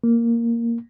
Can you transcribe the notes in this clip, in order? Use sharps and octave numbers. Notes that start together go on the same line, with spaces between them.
A#3